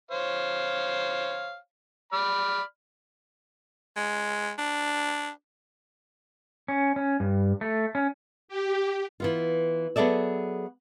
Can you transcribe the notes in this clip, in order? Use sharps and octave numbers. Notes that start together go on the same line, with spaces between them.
C5 C#5 F5
D5 B5 F6
G#3
D4
C#4
C#4
G2
A3
C#4
G4
E3 B3 F4
F#3 B3 G#4 A4 D5 E5